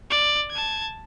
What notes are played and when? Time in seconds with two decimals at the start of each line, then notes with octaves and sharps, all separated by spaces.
0.10 D5
0.51 A5 G#6